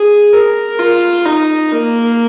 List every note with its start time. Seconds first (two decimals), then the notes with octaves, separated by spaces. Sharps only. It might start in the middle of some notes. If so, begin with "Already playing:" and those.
Already playing: G#4
0.33 A#4
0.79 F4
1.26 D#4
1.71 A#3